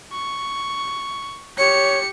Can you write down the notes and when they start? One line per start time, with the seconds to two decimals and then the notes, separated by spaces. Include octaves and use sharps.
0.13 C#6
1.58 G4 C#5 C#7